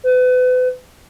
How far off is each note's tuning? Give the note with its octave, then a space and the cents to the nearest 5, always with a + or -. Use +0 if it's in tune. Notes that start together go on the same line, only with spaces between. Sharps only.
B4 +35